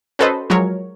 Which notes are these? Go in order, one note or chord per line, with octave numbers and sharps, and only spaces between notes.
C#4 F#4 A4 B4 C5 D#5
F3 F#3 G#3 A#4 C#5